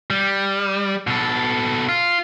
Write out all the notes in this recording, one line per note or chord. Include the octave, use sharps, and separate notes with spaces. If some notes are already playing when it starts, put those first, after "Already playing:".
G3
B2 A4
F4